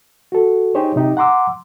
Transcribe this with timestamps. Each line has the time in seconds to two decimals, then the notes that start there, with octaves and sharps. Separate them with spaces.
0.32 F#4 A4
0.75 D#4 G4 G#4 C5 C#5
0.96 C3 D#4 G4
1.17 F#5 A#5 C6 D6 E6